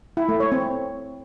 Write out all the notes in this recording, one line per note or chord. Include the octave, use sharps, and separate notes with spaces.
E4
A3
C#5
C4